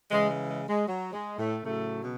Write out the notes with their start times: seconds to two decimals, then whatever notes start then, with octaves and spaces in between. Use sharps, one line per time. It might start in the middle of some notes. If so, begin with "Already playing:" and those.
0.11 C#3 E3 G#3
0.30 G#3
0.49 G#3
0.69 G#3
0.88 F#3
1.13 G#3
1.38 A2 A3
1.64 A2 C#3 F#3 A3
2.02 B2 B3